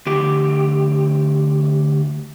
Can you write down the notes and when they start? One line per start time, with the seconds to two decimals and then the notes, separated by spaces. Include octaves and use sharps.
0.07 D2 G4